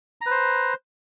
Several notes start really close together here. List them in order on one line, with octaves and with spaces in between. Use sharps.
A#5 B4 C5